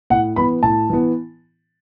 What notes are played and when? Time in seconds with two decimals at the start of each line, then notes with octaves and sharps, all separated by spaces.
0.10 A2 F#5
0.36 E3 B3 B5
0.63 A2 A5
0.90 E3 B3